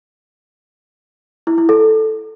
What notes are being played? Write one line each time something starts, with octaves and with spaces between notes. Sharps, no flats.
E4
E4
A4